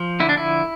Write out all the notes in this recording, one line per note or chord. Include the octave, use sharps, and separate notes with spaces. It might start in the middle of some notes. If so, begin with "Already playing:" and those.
Already playing: F3
D3 E4
D4
E4